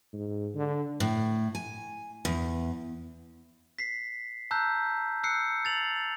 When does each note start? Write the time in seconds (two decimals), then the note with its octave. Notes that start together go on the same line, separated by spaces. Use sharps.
0.13 G#2
0.55 D3
1.00 A2
1.55 G#5
2.25 E2
3.79 B6 C7
4.51 A5 A#5 E6 F#6 G6
5.24 E6 F#6 G6 C7 C#7
5.65 A6 F7 F#7